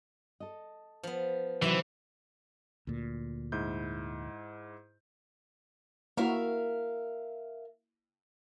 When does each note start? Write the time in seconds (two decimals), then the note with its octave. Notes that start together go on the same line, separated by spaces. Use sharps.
0.40 A4 D#5
1.03 F3 B3
1.62 C3 D#3 E3 F#3 G3 C4 E5
2.87 D2 A#2
3.52 G#2 E4 G6
6.17 A#3 E4 F#4 A#4 E5 F5